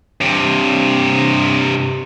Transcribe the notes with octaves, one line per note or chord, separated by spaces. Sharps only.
G2 C3